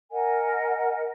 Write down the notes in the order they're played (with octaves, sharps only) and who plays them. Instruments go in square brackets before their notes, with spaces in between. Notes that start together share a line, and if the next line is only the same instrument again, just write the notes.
[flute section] A#4 D#5 F#5 G#5